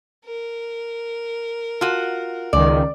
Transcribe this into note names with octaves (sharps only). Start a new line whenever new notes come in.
A#4
F4 F#4
C#2 D#3 D5